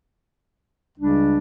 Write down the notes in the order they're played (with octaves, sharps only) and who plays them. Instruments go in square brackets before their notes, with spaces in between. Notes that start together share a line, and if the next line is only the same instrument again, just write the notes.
[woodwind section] C#2 C#3 G3 D4